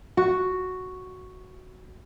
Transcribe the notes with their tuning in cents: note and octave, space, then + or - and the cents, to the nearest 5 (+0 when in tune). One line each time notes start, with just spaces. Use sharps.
F#4 +0